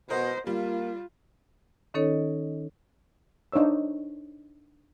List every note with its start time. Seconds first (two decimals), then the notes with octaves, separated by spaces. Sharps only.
0.10 B2 A#4 C5 D#5 F#5
0.47 G3 A#3 F4
1.94 D#3 C#4 D#4 A4 C#5 D#5
3.52 D4 D#4 C5 C#5 E6